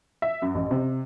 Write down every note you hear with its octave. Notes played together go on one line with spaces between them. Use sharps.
E5
F#2
A1
C3